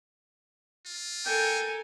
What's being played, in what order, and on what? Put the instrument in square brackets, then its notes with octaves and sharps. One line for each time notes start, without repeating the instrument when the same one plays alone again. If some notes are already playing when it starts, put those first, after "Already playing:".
[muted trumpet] F4
[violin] A4 A#4 [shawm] G5 [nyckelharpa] G#5